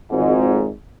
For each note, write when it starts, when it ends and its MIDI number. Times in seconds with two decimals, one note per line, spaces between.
0.11 0.67 32
0.11 0.67 41
0.11 0.67 44